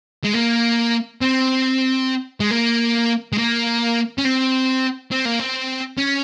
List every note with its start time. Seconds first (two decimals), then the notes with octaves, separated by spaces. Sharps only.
0.25 G#3
0.34 A#3
1.22 C4
2.40 G#3
2.51 A#3
3.33 G#3
3.38 A#3
4.18 C#4
4.25 C4
5.11 C4
5.25 A#3
5.40 C4
5.98 C#4